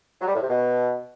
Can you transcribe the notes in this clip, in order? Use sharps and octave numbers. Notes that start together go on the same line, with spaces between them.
F#3
G3
A2
C3
B2